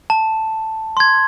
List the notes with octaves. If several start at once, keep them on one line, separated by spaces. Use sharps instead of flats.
A5
C6 G#6